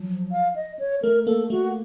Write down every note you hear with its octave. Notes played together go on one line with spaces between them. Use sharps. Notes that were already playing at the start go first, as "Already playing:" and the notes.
Already playing: F3 F#3
F5
D#5
C#5
A3 A#4
A#3 A4
A3 F#4